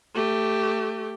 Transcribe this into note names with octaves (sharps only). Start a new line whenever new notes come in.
A3 G4